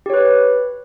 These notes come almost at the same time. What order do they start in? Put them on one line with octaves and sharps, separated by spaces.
G4 C#5 B4